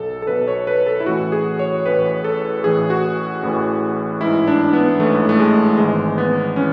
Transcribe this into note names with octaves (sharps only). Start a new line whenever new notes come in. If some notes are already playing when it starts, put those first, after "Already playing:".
Already playing: B1 B2 A4
A4
B1 B2 B4
C#5
B4
A4
E4
A1 A2 E3 F#4
G#4
C#5
A1 A2 E3 B4
A4
A1 A2 E3 G#4
F#4
A1 A2 E3
A1 G#2 E3 E4
D4
B3
A1 G#2 E3 A3
A3
G#3
G#1 G#2 E3 G#3
B3
E3 C#4